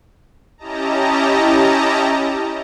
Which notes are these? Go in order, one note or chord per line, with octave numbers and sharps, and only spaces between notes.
C#4 E4 G4 D#5 A5 A#5